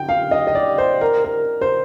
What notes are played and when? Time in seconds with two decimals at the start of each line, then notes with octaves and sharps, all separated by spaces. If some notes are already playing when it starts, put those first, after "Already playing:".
Already playing: G5
0.09 F5
0.31 D#5
0.47 D#5
0.55 D5
0.78 C5
1.01 A#4
1.24 A#4
1.61 C5